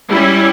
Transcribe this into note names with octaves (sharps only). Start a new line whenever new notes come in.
G3 C#4 E4